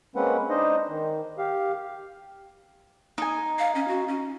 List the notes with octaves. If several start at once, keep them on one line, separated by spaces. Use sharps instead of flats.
G#3 A#3 C4 C#4 B4 F#5
D4 D#4 C5 D#5
D#3
G4 F5
D#4 G#5
F5
C#4
F#4
C#4